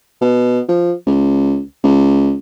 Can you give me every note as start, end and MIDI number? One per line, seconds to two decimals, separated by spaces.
0.21 0.60 47
0.69 0.94 53
1.06 1.60 37
1.84 2.35 37